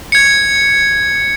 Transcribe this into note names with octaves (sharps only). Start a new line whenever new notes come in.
G#6 C#7